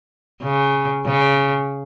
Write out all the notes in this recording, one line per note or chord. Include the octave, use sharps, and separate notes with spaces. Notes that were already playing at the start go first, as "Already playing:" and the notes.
C#3
C#3